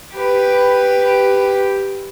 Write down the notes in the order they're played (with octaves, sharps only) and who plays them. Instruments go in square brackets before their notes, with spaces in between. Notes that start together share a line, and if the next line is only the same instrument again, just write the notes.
[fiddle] G4 B4